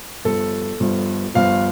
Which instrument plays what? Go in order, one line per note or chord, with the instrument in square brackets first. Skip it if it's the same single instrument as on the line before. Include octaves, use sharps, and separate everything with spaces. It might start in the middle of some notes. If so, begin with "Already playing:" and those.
[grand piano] G1 G2 F3 A4
G1 G2 F3
G1 G2 F3 F5